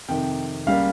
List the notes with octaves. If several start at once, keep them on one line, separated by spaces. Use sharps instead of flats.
F2 C3 D#3 G5
C#2 C#3 G3 A#3 F5